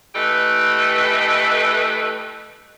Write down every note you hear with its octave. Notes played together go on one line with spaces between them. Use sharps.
E3 A3 G4 A4 B4 D#5